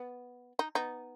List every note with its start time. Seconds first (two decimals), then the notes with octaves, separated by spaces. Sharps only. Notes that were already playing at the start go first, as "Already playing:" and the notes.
Already playing: B3
0.59 D#4
0.75 B3 D#4